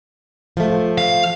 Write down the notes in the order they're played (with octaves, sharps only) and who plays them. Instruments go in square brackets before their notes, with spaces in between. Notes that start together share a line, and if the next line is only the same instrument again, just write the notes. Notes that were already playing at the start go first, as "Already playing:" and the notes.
[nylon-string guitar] F3 A3
[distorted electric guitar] F5